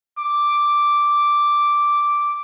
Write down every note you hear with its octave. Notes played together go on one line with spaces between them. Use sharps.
D6